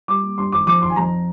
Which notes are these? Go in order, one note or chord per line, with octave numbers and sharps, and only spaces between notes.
G3 D6
A#3
G2 C6
G#1 D6
F3 D6
G#1 C6
G#5
F2 A#5